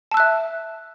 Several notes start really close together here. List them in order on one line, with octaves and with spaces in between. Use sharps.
A5 E6 F#6 E5